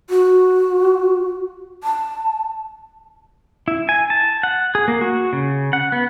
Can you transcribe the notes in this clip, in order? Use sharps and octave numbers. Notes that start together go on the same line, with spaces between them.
F#4
A5
E4
G#5
A5
F#5
G#4
A#3
F#4
C#3
F#5
B3